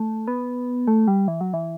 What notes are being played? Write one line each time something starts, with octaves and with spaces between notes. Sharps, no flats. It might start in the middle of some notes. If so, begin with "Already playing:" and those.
Already playing: A3
B3
A3
G3
E3
F#3
E3